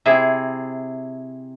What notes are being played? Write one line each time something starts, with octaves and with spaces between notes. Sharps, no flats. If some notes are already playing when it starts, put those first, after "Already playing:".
C3 E4 G#4